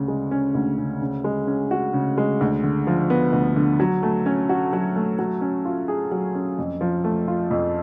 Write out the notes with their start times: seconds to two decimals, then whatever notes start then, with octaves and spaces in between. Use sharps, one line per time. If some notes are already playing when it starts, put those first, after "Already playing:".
Already playing: D2 C#3
0.08 G#3
0.31 C#4
0.55 D2
0.78 C#3
1.01 C#3
1.24 G#3
1.47 C#4
1.71 F#4
1.93 C#3
2.18 G#3
2.41 D2
2.63 D3
2.87 F3
3.10 B3
3.33 D2
3.56 D3
3.80 F#3
4.03 A3
4.26 C#4
4.49 F#4
4.73 F#3
4.96 A3
5.19 F#3
5.41 C#4
5.65 F4
5.88 G#4
6.11 F#3
6.35 C#4
6.58 F2
6.81 F3
7.04 A3
7.28 F4
7.51 F2